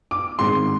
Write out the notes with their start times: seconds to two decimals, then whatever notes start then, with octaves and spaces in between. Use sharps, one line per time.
0.11 D6
0.39 G#2 D#3 G#3 C4 C6